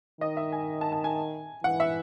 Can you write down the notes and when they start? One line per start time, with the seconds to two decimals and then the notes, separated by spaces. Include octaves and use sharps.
0.21 D#3 D#5
0.37 E5
0.52 G#5
0.81 A5
0.92 A5
1.04 G#5
1.64 E3 F#5
1.80 E5